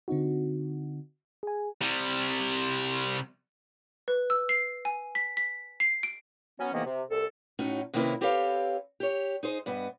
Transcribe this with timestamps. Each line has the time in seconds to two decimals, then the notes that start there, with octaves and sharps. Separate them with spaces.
0.08 D3 C4 D#4 F#4
1.43 G#4 G#5
1.82 C3 G3
4.08 B4
4.30 E6
4.49 C7
4.85 G#5
5.15 B6
5.37 B6
5.80 C7
6.03 D7
6.60 F#3 B3 C#4
6.73 A2 C3 D#3 E3 A#3 B3
6.85 C3
7.10 C2 A4
7.59 A2 C#4 D#4 F#4
7.94 C3 D#3 A#3 C#4 E4 B4
8.21 C4 G4 A4 B4 C#5 F5
9.00 G4 C#5
9.43 D#4 G#4 C5
9.66 G2 B3 D#5